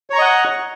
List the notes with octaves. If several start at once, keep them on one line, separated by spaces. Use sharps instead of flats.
C#5 D#5 F#5 A#5 C#6